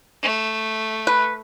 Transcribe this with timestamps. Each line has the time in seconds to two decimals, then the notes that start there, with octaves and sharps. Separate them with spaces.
0.22 A3
1.07 B4